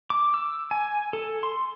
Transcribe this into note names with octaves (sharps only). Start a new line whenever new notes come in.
D6
E6
G#5
A4
C6